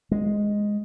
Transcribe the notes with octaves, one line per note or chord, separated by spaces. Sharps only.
G#3